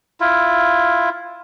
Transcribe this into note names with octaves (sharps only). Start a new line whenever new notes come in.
E4 F4